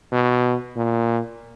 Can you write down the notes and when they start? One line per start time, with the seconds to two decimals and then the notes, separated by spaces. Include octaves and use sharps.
0.12 B2
0.76 A#2